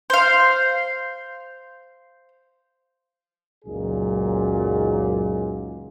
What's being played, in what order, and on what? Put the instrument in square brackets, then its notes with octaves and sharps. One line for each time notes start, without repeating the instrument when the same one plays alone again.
[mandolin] C5 F5
[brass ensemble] C#2 F#2 A#2 F#3 D#4 G#4